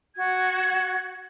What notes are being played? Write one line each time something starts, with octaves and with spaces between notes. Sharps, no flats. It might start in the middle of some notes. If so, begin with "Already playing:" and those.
F#4 G#6